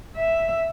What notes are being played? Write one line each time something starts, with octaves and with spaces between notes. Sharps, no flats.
E5